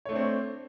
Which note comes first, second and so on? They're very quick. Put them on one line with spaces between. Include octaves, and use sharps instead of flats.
C#5 A3 D4 C4